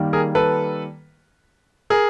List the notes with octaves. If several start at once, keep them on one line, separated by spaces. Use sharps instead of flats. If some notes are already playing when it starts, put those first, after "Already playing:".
Already playing: D#3 G3 A#3
G#4 A#4
A4 B4
G#4 A#4